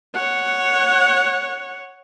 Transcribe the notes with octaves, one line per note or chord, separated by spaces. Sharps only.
C#5 F#5